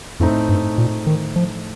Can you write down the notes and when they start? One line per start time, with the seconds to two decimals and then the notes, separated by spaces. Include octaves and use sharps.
0.20 F2 A2 A3 C4 D#4
0.49 G2
0.78 A#2
1.06 D#3
1.36 F3